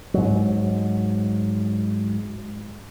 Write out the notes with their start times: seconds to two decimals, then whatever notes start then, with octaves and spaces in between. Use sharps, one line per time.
0.14 G#2 F#3